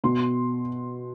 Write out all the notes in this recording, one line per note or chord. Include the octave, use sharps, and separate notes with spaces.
B2 C6